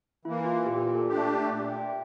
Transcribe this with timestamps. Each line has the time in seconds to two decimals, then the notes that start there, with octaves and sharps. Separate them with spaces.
0.25 E3 A#3 E4
0.45 F4
0.66 A#2 G4
0.94 A4
1.08 A3 D4 G4
1.17 E5
1.22 D5
1.49 A#2 E5
1.71 G5